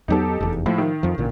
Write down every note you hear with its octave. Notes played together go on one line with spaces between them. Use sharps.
E2 F#3 B3 D#4 G4 A4
F1 E2
A2 F3
D#3
F2 F3
A1 A#2 D3